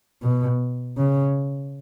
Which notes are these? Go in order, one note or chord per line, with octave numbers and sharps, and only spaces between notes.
B2
C#3